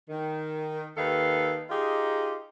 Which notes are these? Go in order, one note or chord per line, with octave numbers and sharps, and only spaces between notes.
D#3
D#2 D#3 A4 B4 F5
D#4 F4 G4 G#4